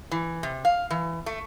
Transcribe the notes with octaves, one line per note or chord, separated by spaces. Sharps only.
E3
C3
F5
E3
A3